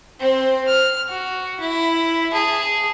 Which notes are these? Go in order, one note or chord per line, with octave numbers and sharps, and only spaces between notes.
C4 C5
F6
F#4
E4
G#4 A5